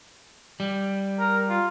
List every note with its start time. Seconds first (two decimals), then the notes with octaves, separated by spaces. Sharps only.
0.60 G3
1.19 A#4
1.49 F4